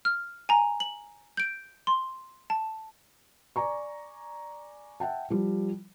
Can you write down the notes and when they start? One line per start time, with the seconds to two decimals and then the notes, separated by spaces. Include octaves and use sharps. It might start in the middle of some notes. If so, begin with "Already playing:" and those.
0.05 F6
0.49 G#5 A#5
0.80 F#7
1.37 G6 D7
1.87 C6
2.50 A5
3.56 D5 G#5 A#5 C#6
5.00 E5 F#5 G5 A5
5.30 F3 G3